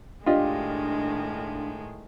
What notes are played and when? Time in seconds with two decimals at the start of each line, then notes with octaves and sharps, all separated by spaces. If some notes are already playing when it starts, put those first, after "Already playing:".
0.26 A2 D#3 G#3 D4 F4 G4 D#5